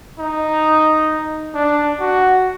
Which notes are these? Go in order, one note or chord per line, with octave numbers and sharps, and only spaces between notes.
D#4
D4
F#4